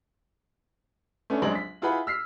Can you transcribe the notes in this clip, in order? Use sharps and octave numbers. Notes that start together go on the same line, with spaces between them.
A3 B3 C#4 D4
A#1 F#3 G#3 C4 D4 F#7
B6
E4 F4 G#4 B4 F#5 B5
E6 F6 B6 C7